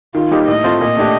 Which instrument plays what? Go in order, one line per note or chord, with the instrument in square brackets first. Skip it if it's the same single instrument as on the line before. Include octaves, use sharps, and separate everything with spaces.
[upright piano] D#3 [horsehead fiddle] F4
[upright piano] G3 A#3 D#4 G4
[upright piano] A2 [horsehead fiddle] D#5
[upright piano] A3 C4 F4
[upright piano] A#2 [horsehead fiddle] D#5
[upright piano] A3 D4 G4